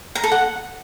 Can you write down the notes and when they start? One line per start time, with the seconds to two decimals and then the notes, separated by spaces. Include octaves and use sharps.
0.15 A#5
0.23 A4
0.32 F#5